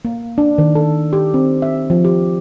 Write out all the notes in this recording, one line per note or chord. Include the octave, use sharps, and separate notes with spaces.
A#3
D4
D#3
A4
G4
C4
E5
F3
G4